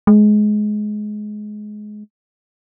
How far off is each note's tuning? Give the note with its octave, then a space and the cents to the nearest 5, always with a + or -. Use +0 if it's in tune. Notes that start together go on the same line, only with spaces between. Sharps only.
G#3 +20